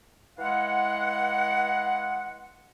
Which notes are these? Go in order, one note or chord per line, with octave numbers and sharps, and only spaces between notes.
E3 G#3 F5 F#5